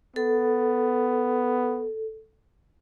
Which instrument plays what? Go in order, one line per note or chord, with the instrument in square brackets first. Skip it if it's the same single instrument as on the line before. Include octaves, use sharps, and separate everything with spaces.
[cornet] B3 [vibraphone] A4